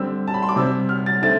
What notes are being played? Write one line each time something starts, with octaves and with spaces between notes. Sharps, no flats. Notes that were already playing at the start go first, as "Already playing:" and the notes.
Already playing: D3 G3 C4 E6
A5
B5
C6
D6
C3 G3 C4 E6
F6
A6
D3 A3 C4 A6